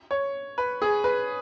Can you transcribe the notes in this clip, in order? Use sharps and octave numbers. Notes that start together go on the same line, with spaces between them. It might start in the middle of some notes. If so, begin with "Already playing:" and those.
C#5
B4
G#4
B4